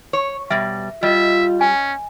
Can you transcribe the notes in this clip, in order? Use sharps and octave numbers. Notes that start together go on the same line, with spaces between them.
C#5
B2 G3 E5
G3 F4 D#5 E5
C#4 G#5